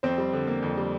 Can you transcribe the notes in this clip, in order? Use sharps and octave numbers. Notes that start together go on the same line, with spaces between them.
F2 C4 C5
G3
D3
A#3
F2
G3